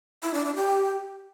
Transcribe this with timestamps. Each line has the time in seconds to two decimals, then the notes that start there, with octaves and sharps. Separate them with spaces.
0.23 E4
0.34 D4
0.45 D4
0.56 G4